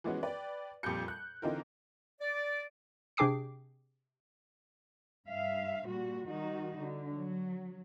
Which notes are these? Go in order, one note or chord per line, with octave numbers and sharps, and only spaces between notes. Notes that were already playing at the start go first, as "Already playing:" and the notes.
E3 F3 G#3 B3 C#4 F#4
B4 D5 G5
F2 A#2 G3 G6 C#7
F#6
D3 E3 C4 D#4 F4 A#4
D5
C3 D4 G#4 G5 D6 C7
G2 E5 F5
A#2 G3 F#4
D#3 G3 D#4 F#4
D3
F#3